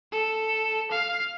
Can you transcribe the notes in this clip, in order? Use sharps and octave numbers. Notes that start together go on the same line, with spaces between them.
A4
F5